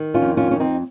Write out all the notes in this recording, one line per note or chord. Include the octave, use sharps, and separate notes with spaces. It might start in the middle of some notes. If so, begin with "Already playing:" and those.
Already playing: D#3
C#4 F4
F2
C#4 F4
F2 C#4
C4 D#4